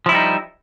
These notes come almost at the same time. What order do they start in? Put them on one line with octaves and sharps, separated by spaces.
F3 E4 G3 D#4